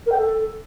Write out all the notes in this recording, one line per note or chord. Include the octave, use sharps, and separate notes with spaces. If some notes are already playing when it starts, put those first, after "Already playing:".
A#4
G5
A4